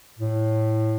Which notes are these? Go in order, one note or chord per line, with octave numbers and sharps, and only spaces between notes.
A2